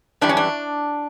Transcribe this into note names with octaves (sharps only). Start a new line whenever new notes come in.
F#2 E3 G3 D4
C#4
D4